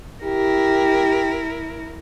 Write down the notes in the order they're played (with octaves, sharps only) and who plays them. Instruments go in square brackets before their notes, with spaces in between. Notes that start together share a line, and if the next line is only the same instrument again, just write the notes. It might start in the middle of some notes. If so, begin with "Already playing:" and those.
[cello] E4 A#4 [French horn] G4